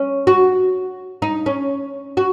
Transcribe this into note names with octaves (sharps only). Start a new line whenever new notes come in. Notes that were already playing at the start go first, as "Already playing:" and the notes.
Already playing: C#4
F#4
D#4
C#4
F#4